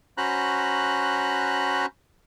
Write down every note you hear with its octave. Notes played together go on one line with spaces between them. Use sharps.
C#4 F#4 C5 A#5 B5 F#6